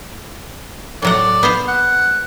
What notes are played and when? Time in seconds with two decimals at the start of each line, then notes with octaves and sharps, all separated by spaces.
1.02 A2 F#3 D5 F#5
1.43 B3 C5 F5
1.68 F#5